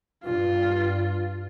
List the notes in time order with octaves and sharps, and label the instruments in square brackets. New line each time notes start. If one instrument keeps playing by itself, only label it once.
[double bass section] G2 [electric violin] F4